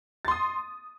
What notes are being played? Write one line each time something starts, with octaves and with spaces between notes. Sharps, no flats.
C6 D#6 A6